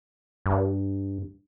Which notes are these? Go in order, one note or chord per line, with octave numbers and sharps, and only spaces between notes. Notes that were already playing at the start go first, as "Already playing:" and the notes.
G2